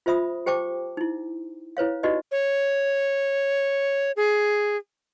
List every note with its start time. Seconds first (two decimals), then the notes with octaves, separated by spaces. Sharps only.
0.06 F4 C5 E5 B5 D#6
0.46 G4 C5 G5 A5 D6
0.97 D#4 E4
1.77 E4 B4 C#5 F5
2.03 D#4 F#4 G4 B4 D5 D#5
2.31 C#5
4.17 G#4